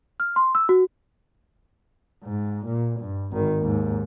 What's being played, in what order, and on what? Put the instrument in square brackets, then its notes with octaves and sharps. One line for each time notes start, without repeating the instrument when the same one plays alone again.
[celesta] F6
C6
E6
F#4
[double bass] G#2
A#2
G2
G#1 D#3
D#2 G#2